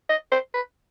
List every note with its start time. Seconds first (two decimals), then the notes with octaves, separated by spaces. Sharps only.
0.09 D#5
0.32 C5
0.54 B4